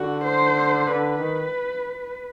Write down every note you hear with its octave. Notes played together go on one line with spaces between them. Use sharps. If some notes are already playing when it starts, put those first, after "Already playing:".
Already playing: D3 F#4
C5
D3 B4
D#3